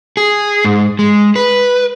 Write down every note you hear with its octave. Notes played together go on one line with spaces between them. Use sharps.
G#4
G#2
G#3
B4